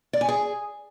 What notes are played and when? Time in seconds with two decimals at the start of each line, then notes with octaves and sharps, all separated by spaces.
0.13 D5
0.21 G#5
0.28 G#4